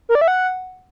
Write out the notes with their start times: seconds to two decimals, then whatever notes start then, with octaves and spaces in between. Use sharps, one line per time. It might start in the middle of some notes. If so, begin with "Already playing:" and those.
0.09 A#4
0.15 D5
0.21 E5
0.28 F#5